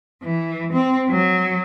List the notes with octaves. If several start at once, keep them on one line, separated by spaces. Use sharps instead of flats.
E3
C4
F#3